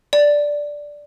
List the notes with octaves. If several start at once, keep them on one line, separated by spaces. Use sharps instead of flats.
D5